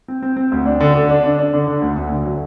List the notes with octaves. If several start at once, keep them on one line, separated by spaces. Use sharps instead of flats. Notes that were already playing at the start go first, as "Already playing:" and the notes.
C4
C4
C4
D2
D4
D3
D3
D4
D4
D4
D3
D3
D2
D2
D3
F#3